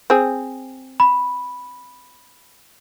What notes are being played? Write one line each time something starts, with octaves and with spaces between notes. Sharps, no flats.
C4 G#4
B5